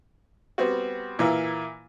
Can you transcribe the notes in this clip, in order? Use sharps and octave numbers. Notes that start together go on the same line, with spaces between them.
G3 B3 C4 F#4
A#2 E3 A#3 E4